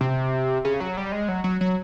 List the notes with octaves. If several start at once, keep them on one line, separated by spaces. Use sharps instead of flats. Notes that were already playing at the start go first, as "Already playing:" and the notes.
C3
C#3
F#3
G3
G#3
F#3
F#3
F#3